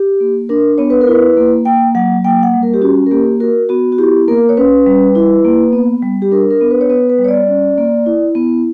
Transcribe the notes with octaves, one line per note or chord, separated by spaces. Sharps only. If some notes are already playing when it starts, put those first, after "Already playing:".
Already playing: G4
A#3
D4 A#4
B3 C#5
B4
A#4
E4 B4
A#3
A#3 G5
F#3 F#5
A#3 G5
F#5
G3
A#4
G4
C#4 F#4
A#4
A#3 G4
F#4 A#4
B3 F#4
F#4
E4 G4
A#3 A#4
C#5
C#4 B4
G3
E4
A#3
B3
G3
G4
D4 A#4
A#4
B3
B4
C#5
B3 B4
B4
G3
C#5
D5
C#4
A#3
E4
B3